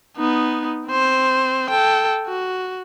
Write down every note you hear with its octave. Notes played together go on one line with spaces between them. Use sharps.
B3 D#4
C4 C5
A4 G5
F#4